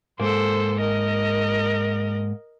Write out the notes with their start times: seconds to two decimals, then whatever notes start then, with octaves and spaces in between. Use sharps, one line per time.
0.20 G#2 A#3 A4 C5
0.80 A#4 D#5